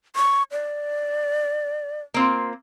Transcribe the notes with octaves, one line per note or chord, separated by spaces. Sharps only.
C#6
D5
A#3 C4 F4